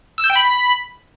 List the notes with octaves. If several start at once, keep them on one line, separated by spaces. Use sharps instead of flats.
E6
G6
G5
B5